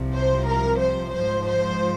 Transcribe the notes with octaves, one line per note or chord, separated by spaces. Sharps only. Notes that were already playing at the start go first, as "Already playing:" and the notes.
Already playing: C2 C3 F3
C5
A#4
C5
G#2 F3 C5
C5